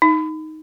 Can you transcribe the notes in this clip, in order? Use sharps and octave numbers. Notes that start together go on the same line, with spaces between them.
D#4